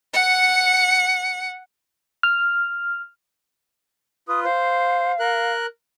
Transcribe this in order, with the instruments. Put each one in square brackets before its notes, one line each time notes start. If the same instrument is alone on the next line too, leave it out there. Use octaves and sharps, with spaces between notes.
[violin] F#5 C#7
[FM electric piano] F6
[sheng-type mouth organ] F4 B4 [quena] D#6
[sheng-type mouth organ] C5 [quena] F5
[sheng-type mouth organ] A#4 F#6